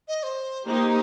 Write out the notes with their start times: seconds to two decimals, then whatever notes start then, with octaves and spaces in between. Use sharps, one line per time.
0.08 D#5
0.23 C5
0.67 A#3 D#4 G4 C5